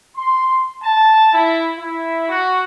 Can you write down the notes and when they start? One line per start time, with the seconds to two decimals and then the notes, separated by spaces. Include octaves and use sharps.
0.16 C6
0.82 A5
1.33 E4
1.78 E4
2.28 F#4